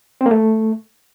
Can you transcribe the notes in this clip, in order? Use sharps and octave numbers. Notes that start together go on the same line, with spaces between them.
C4
A#3
A3